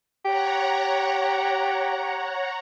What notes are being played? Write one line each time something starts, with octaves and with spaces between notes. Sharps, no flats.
G4 C#5 F#5 A#5